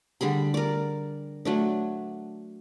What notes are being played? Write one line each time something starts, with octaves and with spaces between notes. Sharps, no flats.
D3 G3 G#4 B5
A#4 D5
F#3 A3 D4